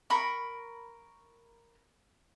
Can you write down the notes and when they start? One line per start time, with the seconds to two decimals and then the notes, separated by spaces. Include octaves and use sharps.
0.10 A#4 B5 C#6